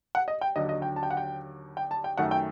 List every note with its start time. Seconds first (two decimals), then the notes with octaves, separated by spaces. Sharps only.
0.15 F#5
0.28 D#5
0.41 G5
0.56 D#2 D3 F#3 D#5
0.69 D#5
0.82 G5
0.96 A5
1.03 G5
1.11 F#5
1.17 G5
1.77 G5
1.91 A5
2.04 G5
2.18 F#2 D#3 F#3 A3 F#5
2.31 G5